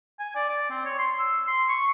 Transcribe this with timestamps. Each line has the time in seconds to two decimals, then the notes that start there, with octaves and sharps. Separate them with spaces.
0.20 G#5
0.35 D5
0.50 D5
0.70 C4
0.85 C#5
0.99 C6
1.19 E6
1.47 C6
1.69 C#6